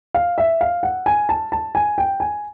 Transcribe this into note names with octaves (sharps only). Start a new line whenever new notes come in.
F5
E5
F5
F#5
G#5
A5
A5
G#5
G5
G#5